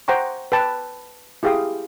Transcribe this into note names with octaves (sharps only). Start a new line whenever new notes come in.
C5 F#5 G5 A#5 C#6
B4 G5 A5
E4 G4 G#4 F5 G5 D#6